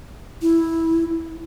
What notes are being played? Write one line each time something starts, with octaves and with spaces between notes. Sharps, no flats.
E4